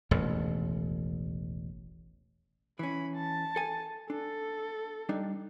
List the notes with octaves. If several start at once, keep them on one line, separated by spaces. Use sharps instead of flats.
E1 A1 D#2
E3 C#4 B5
A5
A4 G#5
D4 A4
G3 D4 D#4